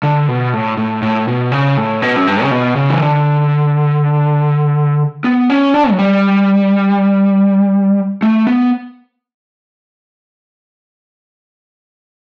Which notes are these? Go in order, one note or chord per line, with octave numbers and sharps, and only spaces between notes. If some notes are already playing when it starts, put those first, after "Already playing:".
D3
B2
A2
A2
A2
B2
C#3
A2
B2
F#2
G2
C#3
B2
C#3
E3
D3
B3
C#4
D4
F#3
G3
A3
B3